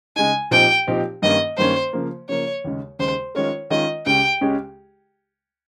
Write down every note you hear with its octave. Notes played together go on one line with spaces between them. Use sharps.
C#3 G#3 D#4 G#5
A#2 F3 C4 D#4 G4 G5
A#2 F3 C4 D#4 G4
G2 D#3 A#3 C#4 D#5
G2 D#3 A#3 C#4 C5
C#3 F3 A#3
C#3 F3 A#3 C#5
D#2 C#3 G#3
D#2 C#3 G#3 C5
D#3 G#3 C#4 F4 A#4 C#5
D#3 G#3 C#4 F4 A#4 D#5
C#2 C#3 G#3 C#4 G4 G5
C#2 C#3 G#3 C#4 G4